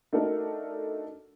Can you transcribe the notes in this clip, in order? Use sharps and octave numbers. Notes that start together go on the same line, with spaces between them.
A3 D4 D#4 F#4 A4 A#4